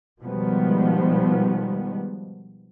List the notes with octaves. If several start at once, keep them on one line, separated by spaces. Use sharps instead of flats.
B2 D#3 F3 G3 G#3 B3